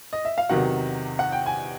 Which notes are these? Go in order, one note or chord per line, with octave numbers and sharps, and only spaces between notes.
D#5
E5
F5
E2 C3 D#3 F#3 F#5
F#5
G5
G#5